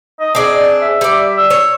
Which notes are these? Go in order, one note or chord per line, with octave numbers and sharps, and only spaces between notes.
D#5
C4 D4 G#4 D#5
E5
G3 D5
E6
C#5